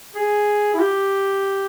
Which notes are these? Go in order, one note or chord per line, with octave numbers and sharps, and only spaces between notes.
G#4
E4
G4